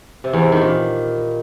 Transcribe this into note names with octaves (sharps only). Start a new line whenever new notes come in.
C3
E2
C3
D#3
A#2